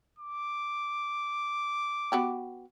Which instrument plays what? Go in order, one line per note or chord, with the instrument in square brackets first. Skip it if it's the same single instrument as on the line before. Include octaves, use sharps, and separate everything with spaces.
[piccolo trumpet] D6
[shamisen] B3 F#4 G4